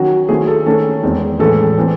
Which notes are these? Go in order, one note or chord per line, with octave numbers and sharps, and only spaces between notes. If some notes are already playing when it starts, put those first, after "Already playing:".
Already playing: D#3 F#3 C#4 F#4
D#3 F#3 A3 C4 E4 G#4
A4
D#3 A3 C#4 A4
E2 D#3 G#3 C4
A2 E3 G#3 C#4 A4
E3 C4